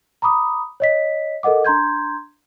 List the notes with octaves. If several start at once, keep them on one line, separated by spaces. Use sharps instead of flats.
A#5 B5 D6 D#6
C#5 D#5 B6
A4 A#4 D#5 F#5 D6
D4 A#5 C6 G6 G#6